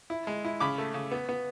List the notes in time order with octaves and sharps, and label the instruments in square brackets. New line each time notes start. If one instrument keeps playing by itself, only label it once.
[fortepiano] E4
G#3
E4
C#3 B5 D6
A3
C#3
B3
B3